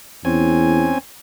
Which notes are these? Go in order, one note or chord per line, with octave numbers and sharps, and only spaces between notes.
E2 C4 C#4 G#5